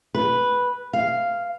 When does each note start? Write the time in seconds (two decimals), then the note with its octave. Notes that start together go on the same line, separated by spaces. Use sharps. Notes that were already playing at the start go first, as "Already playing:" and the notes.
0.15 B4
0.93 F5